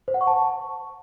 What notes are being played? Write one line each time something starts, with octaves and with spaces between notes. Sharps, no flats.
C5
F#5
C#6
A5